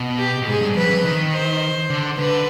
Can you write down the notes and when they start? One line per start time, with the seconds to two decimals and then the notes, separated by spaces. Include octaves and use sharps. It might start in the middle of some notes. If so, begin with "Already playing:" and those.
Already playing: B2
0.18 G4
0.42 B2
0.47 G#2 G#4
0.61 G2
0.75 F2 B4
0.90 F2
1.04 D#3
1.33 C5
1.90 D3
2.18 D3 B4